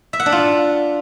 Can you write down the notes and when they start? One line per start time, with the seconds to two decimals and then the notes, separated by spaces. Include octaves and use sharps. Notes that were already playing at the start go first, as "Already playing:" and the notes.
0.13 E5
0.20 F#5
0.26 D4
0.32 F4